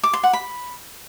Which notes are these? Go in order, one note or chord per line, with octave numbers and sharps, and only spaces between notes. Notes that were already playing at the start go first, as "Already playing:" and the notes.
D6
C6
F#5
B5